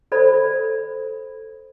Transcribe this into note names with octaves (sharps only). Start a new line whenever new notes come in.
A4 C5 D5 B5